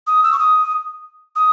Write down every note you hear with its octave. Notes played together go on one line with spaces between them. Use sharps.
D#6
E6
C#6
D#6
D#6